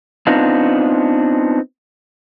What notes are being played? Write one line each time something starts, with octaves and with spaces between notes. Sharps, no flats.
B3 C4 D4 D#4 F4